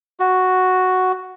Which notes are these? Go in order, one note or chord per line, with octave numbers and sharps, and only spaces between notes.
F#4